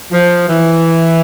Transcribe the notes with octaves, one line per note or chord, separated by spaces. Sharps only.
F3
E3